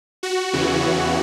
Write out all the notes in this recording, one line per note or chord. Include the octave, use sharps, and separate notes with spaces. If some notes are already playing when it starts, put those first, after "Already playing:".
F#4
E2 C#3 E3